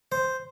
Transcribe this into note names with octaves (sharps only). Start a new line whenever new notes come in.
C5